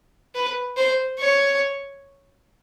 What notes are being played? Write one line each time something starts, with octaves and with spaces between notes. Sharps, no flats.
B4
C5
C#5